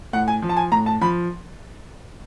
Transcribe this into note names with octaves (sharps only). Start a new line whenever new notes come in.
A2 F#5
G#5
F3
A5
G#5
A2 A#5
A5
F3 B5